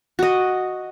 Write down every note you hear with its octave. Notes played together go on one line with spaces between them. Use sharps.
F#4 D#5